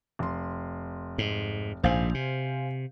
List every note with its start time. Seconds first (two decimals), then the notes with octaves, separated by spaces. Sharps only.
0.19 F1 C6
1.18 G#2
1.83 A#1 G#2 C5 F5 G#5
2.14 C3